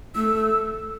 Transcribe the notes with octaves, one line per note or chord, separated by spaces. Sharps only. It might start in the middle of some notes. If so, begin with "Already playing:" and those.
A3 E6